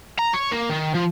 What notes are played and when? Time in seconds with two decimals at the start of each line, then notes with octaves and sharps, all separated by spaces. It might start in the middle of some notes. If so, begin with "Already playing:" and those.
0.19 A#5
0.34 C#5
0.52 A#3
0.70 D#3
0.95 F3